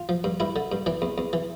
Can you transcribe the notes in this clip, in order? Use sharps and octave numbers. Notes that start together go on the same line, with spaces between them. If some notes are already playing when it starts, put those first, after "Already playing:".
Already playing: F4
F3
G2
G2 E4
D3
G2
E3 D4
E2
E2
E3